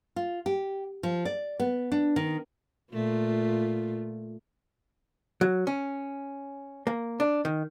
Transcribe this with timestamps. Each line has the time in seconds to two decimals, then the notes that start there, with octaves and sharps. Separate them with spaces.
0.16 F4
0.46 G4
1.03 F3
1.25 D5
1.60 B3
1.92 D4
2.16 D#3
2.93 A#2 A3 F4
5.41 F#3
5.67 C#4
6.87 A#3
7.20 D4
7.45 D#3